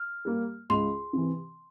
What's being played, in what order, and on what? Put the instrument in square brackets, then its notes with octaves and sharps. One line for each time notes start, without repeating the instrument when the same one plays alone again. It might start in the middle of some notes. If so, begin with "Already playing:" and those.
Already playing: [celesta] F6
[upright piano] G3 A#3
[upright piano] C#2 [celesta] C6
[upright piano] C3 E3